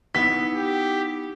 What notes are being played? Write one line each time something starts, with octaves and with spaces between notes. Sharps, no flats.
B3 D#4 E4 B6
G4